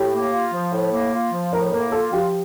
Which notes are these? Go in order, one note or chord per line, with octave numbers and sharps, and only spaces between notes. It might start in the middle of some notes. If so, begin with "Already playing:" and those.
Already playing: A2 G4
A#3
F4
F3
A2
A#3
F4
F3
A2 A#4
A#3 A#4
F4 A4
F3 G4